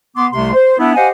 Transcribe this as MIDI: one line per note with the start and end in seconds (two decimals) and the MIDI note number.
0.16 0.26 59
0.16 0.26 84
0.16 0.26 86
0.33 0.53 36
0.33 0.53 48
0.33 0.53 57
0.33 0.53 84
0.54 0.78 72
0.79 0.95 59
0.79 0.95 62
0.79 0.95 64
0.95 1.09 67
0.95 1.09 72
0.95 1.09 75
0.95 1.09 77
0.95 1.09 78
0.95 1.09 80